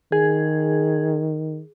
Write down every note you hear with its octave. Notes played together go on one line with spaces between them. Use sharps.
D#3 G#4